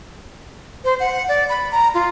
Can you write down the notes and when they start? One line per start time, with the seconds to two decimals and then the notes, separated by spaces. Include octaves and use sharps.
0.85 C5
1.00 F#5
1.28 D5
1.49 B5
1.72 A#5
1.94 F4